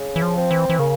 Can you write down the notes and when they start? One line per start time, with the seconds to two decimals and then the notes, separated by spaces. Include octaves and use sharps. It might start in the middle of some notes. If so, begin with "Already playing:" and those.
Already playing: C#3
0.16 E3
0.22 F3
0.37 C4
0.51 E3
0.70 E3
0.79 C#3 A#3